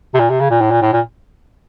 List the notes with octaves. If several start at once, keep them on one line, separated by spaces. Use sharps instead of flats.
C3
A#2
C3
C#3
A#2
A2
A#2
A2
A#2